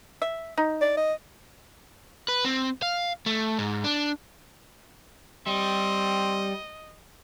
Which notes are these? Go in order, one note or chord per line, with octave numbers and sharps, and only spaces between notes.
E5
D#4
D5
D#5
B4
C4
F5
A3
G#2
D4
G3 C4 D#5